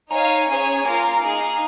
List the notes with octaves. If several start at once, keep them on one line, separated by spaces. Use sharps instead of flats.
D#4 C#5 F5 G#5 A#5
C#4 G#4 C#5 G#5
A#3 F4 A#4 F5 G#5
A#5
D#4 G#4 F5 G#5
A#5